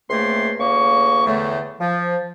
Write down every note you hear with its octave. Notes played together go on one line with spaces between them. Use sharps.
C#2 C3 A3 A#3 C6
D2 C#3 A#3 C#6
E2 A2 D3 A3
F3